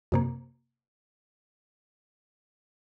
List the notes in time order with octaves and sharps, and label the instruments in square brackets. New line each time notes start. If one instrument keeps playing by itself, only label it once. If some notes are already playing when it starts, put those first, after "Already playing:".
[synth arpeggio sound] F#2 C3 A#3